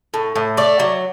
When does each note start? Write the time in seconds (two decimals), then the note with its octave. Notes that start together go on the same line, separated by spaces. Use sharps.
0.14 A2
0.36 A2
0.57 A3 D5
0.80 F#3